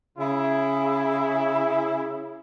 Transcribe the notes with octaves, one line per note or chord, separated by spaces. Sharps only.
C#3 E4